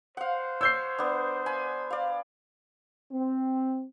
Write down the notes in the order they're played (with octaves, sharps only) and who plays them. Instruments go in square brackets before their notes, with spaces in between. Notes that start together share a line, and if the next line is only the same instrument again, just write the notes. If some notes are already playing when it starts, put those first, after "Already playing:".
[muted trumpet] C5 [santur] F5 F#5
[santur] C#5 [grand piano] E6 G6 C7
[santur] B3 D4
G#5 B5
D5 F5
[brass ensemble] C4